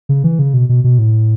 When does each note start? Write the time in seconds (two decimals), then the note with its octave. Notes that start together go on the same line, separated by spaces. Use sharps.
0.09 C#3
0.24 E3
0.39 C#3
0.54 B2
0.69 B2
0.84 B2
0.99 A2